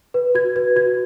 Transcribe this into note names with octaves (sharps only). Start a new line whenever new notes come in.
B4
F#4 G#6
B4 G#6
F#4 G#6